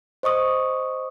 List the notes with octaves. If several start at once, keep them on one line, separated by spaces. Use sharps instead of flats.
C5 D#5 C#6 D#6